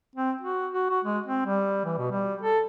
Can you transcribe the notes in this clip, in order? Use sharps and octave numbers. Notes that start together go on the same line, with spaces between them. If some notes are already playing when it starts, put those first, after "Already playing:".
C4
F#4
F#4
F#4
G#3
C4
G3
E3
B2
G3
A4